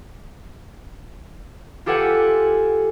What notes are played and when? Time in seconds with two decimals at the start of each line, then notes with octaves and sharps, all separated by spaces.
1.86 F4 G4 A4 B4 F#5 G#5